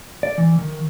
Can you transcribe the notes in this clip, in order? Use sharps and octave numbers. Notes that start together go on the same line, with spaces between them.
D5
E3
D#3